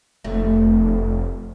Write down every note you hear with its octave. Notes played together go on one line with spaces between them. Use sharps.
F1 A3